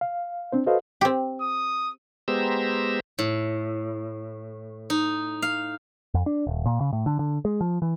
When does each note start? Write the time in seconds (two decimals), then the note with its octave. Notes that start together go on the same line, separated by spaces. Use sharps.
0.01 F5
0.52 C4 D4 C5
0.66 F#4 A4 B4 C5 D#5 F5
1.01 C4 G4
1.41 D#6
2.28 G#3 B3 G4 C5 A#5 E6
3.19 A2
4.90 D#4
5.42 F5
6.14 F2
6.26 D4
6.47 D#1
6.66 A#2
6.81 C#3
6.93 A2
7.06 D3
7.19 D3
7.45 G#3
7.61 F3
7.82 E3